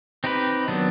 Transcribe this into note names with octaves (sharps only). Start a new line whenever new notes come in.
C4 D#4 G4 B4
D#3 F#3 B3 D4